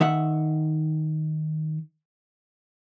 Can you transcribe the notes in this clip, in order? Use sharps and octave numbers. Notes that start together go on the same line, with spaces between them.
D#3 E5 F#5